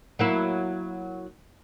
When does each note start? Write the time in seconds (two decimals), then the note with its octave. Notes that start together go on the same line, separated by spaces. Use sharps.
0.19 F#3 A#3 E4